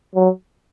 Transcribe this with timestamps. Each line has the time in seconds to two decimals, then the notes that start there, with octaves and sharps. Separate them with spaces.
0.15 F#3